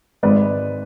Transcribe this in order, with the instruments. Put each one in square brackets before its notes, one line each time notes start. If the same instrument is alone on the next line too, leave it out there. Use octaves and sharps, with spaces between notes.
[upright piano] G#1 G#2 G#3 B4 D5